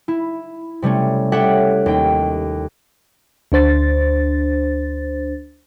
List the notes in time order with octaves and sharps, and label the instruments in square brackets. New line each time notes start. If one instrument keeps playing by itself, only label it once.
[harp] E4
C3 G3 A3 C#4
G4 A4 C#5 E5 F#5 G5
D#2 G5
[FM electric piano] D2 D4 C5 A6